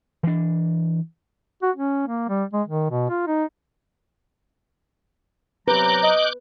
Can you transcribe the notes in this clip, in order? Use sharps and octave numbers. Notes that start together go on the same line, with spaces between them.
E3 D4
F#4
C#4
A#3
G3
G#3
D#3
B2
F4
D#4
C3 F#3 B4 A#5 D6 F#6 G6
D#5